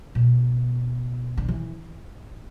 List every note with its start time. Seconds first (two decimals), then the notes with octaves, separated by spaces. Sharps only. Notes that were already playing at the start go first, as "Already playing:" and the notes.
0.15 B2
1.37 D3
1.48 E3